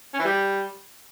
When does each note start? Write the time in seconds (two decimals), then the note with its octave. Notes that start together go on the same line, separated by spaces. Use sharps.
0.14 C#4
0.19 E3
0.25 G3